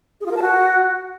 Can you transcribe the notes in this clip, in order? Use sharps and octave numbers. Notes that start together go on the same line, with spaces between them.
G#4
F4
A#4
A5
F#4